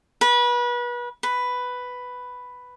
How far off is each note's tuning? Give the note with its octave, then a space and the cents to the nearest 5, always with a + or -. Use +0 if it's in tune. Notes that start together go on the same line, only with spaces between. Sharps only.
B4 -30
B4 +5